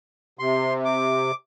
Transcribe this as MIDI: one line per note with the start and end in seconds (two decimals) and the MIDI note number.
0.39 1.31 48
0.39 0.73 84
0.85 1.34 86